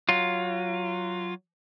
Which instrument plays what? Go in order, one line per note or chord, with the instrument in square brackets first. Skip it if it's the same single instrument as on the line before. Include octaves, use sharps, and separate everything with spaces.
[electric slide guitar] F#3 F4